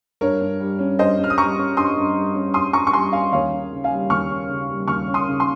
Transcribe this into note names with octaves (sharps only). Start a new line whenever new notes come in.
G2 A#4 C#5
G2
G3
C#4
G2 C5 D#5
G2
F6
D#6
G3 A#5 C#6
C#4
G2 C6 D#6
G2
G3
C#4
G2 C6 D#6
G2 A#5 C#6
C#6
G3 G#5 C6
C#4 F5 G#5
D#2 C#5 F5
C#4
C#3
F5 G#5
G3
D#2 C#6 F6
C#4
C#3
G3
D#2 C#6 F6
C#4
C6 D#6
C#3
C6